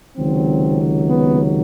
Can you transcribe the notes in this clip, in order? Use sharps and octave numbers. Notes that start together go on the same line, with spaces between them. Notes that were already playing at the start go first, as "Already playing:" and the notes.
C#2 C3 D#3 F#3 C4
B3